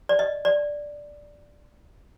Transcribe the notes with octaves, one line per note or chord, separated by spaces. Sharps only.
D5
D#5
D5